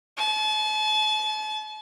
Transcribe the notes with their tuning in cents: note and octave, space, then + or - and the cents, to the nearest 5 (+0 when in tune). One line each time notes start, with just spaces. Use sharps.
A5 -40